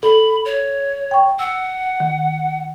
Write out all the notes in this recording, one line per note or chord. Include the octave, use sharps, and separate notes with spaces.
A4 B5
C#5
G5 C#6
F#5 E6
D#3